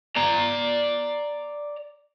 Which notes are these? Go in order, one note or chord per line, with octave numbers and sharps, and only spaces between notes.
D5 A#5